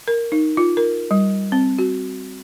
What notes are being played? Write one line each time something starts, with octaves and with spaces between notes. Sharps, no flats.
A#4
D#4
F4
A#4
G3
C4
F#4